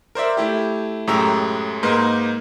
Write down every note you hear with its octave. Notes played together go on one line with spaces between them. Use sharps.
A#4 C5 D5 E5
A3 E4 G4
F#2 A2 G#3 G4 A#5 E6
G#2 A#3 D#4 A#4 B4 C6